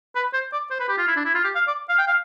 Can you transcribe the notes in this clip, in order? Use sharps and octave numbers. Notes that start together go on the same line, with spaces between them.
B4
C5
D5
C5
B4
G4
F4
E4
D4
E4
F4
G4
F5
D5
F5
G5
F5